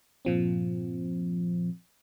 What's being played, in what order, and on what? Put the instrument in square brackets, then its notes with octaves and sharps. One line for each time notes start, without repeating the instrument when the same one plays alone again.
[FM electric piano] G2 A#2 F3 C4